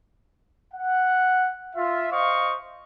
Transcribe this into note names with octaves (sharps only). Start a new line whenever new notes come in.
F#5
F4 E5
C5 D#5 F5 C#6